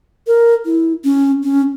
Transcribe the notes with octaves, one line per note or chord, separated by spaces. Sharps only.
A#4
E4
C#4
C#4